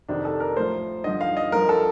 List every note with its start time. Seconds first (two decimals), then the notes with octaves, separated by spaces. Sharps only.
0.08 F2 C3 D#3 D4
0.25 A4
0.40 A#4
0.57 A2 F3 C5
1.04 G2 D3 F3 D#5
1.21 F5
1.37 D#5
1.52 G2 D3 F3 A#4
1.69 A4